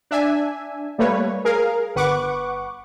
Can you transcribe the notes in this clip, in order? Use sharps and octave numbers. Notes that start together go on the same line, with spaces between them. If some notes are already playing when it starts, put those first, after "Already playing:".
D4 E5 G#5
G3 A3 A#3 B4 C#5
G#4 A#4 F5
G1 B4 F#5 C#6 D6